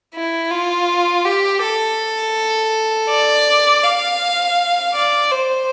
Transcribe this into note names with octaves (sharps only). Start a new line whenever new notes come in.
E4
F4
G4
A4
D5
F5
D5
C5